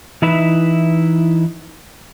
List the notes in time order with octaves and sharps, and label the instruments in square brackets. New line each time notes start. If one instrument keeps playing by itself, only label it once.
[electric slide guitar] E3 D#4 E4 B4 E5